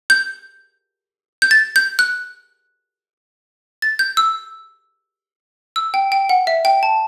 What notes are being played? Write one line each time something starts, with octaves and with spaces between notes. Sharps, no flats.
G6
G6
A6
G6
F#6
A6
G6
E6
E6
G5
G5
F#5
E5
G5
A5